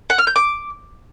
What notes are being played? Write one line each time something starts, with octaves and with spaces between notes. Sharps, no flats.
F#5
F6
G6
D6